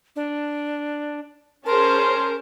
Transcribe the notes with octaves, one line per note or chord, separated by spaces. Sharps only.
D4
C#4 G#4 A#4 C5 A5 C6